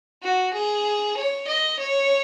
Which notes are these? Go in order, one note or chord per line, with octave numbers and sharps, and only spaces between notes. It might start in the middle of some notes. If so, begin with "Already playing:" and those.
F#4
G#4
C#5
D#5
C#5